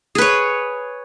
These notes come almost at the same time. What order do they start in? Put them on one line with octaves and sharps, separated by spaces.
G#4 B4 C#5